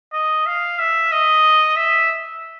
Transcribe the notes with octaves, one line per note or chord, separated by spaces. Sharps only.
D#5
F5
E5
D#5
E5